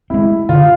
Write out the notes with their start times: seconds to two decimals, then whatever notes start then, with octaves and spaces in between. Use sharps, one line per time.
0.10 G#3 C4 E4
0.49 D3 F4